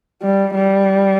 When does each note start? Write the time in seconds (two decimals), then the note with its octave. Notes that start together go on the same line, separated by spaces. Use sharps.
0.22 G3
0.55 G3